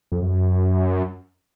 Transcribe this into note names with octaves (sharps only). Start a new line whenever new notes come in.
F2
F#2